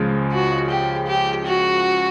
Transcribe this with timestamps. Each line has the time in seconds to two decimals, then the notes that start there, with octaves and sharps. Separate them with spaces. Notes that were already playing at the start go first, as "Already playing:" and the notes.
Already playing: C#2 C#3 F3 G#3
0.32 F#4
0.69 G4
1.07 G4
1.46 F#4